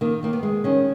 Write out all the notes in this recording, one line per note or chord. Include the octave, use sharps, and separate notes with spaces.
D#3 A#3
D#3 A#3
B3
G#3
D#3 C#4